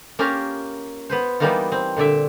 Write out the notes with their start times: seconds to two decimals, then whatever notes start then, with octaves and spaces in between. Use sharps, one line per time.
0.19 A#3 C#4 F4 G4 A#4
1.09 B3 B4 C5
1.40 E3 G3 A#3 B3 D#4 F4
1.72 C4
1.97 A#2 D3 D5 E5